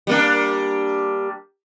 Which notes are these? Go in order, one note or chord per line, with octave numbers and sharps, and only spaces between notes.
G3 A#3 D4